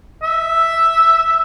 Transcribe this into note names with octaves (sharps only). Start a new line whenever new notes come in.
E5